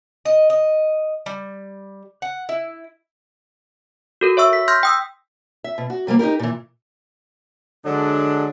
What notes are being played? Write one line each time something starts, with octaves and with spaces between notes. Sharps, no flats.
D#5
D#5
G3
F#5
E4
F#4 A4 A#4
C#5 E5 C#6 E6
B6
C6 F6 G6 A#6 B6
G5 D#6 E6
E5
B2
F#4
C3 G3 G#3 A#3
D#4 F4 G4 A#4
A#2 E3
D3 F#3 G#3 D4